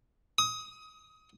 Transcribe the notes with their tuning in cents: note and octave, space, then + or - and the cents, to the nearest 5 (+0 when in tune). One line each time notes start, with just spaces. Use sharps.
D#6 +25